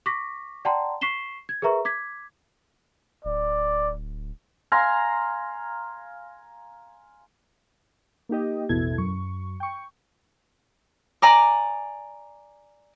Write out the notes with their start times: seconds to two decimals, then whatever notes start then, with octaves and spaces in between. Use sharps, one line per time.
0.06 C#6 D6 A#6 B6
0.65 D5 F#5 G5 A5 A#5 C6
1.01 C#6 B6 C7 E7 G7
1.49 G#6
1.62 G#4 A#4 B4 E5 A#5 C#6
1.85 D6 G#6 B6
3.25 D1 D5
4.72 F5 G#5 A#5 C6
8.29 A#3 D#4 G4 D#5
8.69 A1 E2 B2 E4 A4 G#6
8.98 F#2 C#6
9.60 G5 C#6
11.22 D5 G#5 A#5 D6